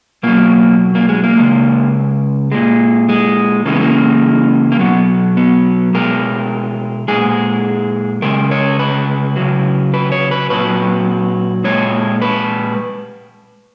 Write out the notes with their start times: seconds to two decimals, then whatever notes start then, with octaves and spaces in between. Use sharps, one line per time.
0.23 B2 F#3 A#3
0.95 A#3
1.09 G#3
1.24 A#3
1.37 C#3 G#3
2.52 A#2 G#3
3.09 G#3
3.65 C#3 E3 G#3 A#3
3.73 B3
3.80 A#3
4.72 A#3
4.79 B2 F#3 B3
5.37 B3
5.94 B2 G#3 A#4
7.08 A#2 G#3 G#4
8.22 C#3 G#3 A#4
8.51 C#5
8.79 B4
9.36 C#3 F#3
9.94 B4
10.12 C#5
10.31 B4
10.50 A#2 F#3 B4
11.64 A#2 G#3 C#5
12.22 B4